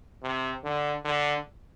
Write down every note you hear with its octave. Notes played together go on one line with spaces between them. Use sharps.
C3
D3
D3